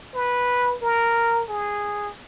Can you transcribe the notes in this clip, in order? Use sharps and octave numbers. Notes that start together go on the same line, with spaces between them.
B4
A#4
G#4